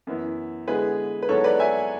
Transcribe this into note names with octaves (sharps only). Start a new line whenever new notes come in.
F#2 E3 B3 E4
D3 G#3 B3 E4 G#4 B4
B4
G#2 F#3 B3 E4 A4 C#5
B4 D5
E5 G#5